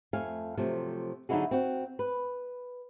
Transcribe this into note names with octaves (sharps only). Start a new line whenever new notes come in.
F2 A3 F5 G#5
C3 F3 F#3 A3
D3 F#3 D#4 E4 F#4 G#4
C4 F#4
B4